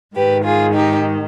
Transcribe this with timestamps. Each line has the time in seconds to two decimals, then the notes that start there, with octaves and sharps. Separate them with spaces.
0.15 G#2 D#3 G4 B4
0.44 F4 G#4
0.73 D#4 G4